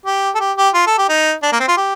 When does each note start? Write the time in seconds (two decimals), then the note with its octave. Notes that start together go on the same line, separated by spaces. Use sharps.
0.06 G4
0.35 A4
0.40 G4
0.57 G4
0.74 F4
0.87 A4
0.98 G4
1.09 D#4
1.43 D4
1.52 A#3
1.60 C4
1.68 F4
1.77 G4